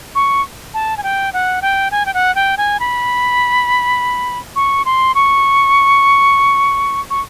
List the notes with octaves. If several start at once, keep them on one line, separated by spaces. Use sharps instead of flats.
C#6
A5
G#5
G5
F#5
G5
G#5
G5
F#5
G5
G#5
B5
C#6
C6
C#6
C#6